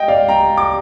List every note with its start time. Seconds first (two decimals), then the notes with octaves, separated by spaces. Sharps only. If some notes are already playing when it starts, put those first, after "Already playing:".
Already playing: D#5 G5
0.08 D5 F5
0.29 G5 A#5
0.58 D6